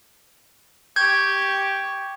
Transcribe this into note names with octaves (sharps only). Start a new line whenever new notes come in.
G4 C#6 G6 G#6